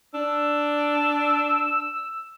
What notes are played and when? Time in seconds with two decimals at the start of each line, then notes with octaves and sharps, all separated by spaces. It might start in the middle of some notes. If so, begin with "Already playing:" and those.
0.14 D4 E6